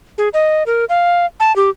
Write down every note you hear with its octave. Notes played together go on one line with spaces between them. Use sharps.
G#4
D#5
A#4
F5
A5
G4